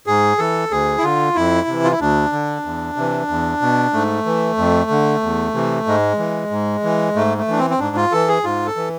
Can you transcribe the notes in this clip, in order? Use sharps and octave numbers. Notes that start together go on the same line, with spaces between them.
G#2 G#4
E3 A4
D2 G#4
E4
D3 F4
F2 E4
C3 E3
F4
E4
D2 D4
D3
E2
C3 E3
E2
B2
G#2 A3
E3
F2
D3
E2
C3 E3
G#2 G#3
E3
G#2
E3
G#2 A3
A3
E3 D4
C4
C4
G#2 D4
F4
E3 A4
G#4
G#2 F4
A4
E3